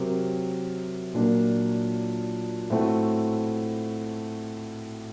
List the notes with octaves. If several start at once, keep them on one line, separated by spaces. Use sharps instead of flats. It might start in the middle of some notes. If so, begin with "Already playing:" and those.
Already playing: C3 F#3 C4 G4 A#4
A#2 F#3 A#3 D4
A2 A3 C4 F#4